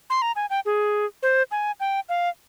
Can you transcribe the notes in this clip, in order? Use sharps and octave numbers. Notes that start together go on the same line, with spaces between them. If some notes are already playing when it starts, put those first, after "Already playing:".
C6
A#5
G#5
G5
G#4
C5
G#5
G5
F5